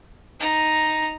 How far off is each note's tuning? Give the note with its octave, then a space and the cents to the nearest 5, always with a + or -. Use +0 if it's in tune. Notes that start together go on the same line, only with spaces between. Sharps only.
D#4 +0 A#5 +0